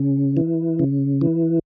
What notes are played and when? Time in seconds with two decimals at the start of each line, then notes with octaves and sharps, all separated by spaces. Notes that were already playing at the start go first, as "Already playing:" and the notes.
Already playing: C#3
0.37 E3
0.79 C#3
1.21 E3